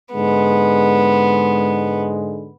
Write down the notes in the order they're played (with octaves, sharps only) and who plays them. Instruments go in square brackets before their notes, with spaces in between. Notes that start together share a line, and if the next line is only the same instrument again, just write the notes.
[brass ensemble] G#2 D3 G#3 [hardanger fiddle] B3